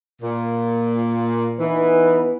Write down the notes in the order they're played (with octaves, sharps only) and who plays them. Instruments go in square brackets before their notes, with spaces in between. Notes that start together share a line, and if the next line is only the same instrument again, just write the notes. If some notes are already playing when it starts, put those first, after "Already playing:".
[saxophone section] A#2
[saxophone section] E3 [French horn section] B3 D#4 B4